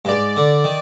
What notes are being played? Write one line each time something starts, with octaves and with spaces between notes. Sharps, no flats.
G2
G#2 D5
D3
D#3